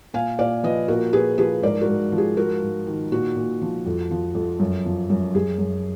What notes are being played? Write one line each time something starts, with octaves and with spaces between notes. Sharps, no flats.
A#2 F5 G#5
A#2 D5 F5
F3 B4 D#5
A#2 F#4 A#4
A#2 G#4 B4
F3 G#4 B4
G#2 A#4 D5
F#4 A#4
G#2
F3
G#4
G#2 F#4 A#4
G#2
D#3
A#2 F#4
A#2
F3
F2
F3
F2
F#2
F3
F#2
F#2 G#4
F#2